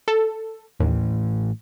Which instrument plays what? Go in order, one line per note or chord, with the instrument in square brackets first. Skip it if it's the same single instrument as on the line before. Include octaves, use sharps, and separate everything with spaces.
[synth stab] A4
[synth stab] D#2 [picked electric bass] A2 E3